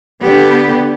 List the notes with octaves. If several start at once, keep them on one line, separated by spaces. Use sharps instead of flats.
D3 B3 G4